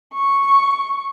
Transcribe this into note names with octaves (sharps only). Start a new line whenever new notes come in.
C#6